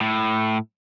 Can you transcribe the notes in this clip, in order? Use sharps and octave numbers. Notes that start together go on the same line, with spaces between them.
A2